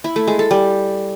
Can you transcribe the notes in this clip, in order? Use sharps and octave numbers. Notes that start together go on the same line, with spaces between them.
E4
A3
G#3
A4
G3